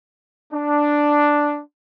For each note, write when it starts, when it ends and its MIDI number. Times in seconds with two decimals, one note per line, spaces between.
0.53 1.62 62